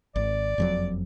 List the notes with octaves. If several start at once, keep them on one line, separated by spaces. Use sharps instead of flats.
G#1 D5
F#1 F2 F#3